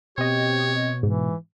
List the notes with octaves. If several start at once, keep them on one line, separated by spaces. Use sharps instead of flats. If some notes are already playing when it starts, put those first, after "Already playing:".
B2 C4 G4 C#5 D#5
G#2 E3